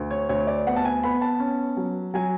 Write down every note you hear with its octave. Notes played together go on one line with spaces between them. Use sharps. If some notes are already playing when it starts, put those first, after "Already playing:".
Already playing: D2
C#5
D2 C#5
D5
B3 F#5
A5
G#5
B3 B5
A5
C#4
F#3
F#3 G#5